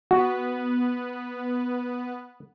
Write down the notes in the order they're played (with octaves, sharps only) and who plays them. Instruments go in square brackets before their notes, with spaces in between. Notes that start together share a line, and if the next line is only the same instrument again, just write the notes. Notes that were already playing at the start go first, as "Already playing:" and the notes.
[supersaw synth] B3 B4 [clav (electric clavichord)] F#4